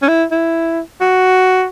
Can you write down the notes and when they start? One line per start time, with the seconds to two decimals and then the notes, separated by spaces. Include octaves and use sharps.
0.02 C#4
0.08 E4
0.31 E4
1.01 F#4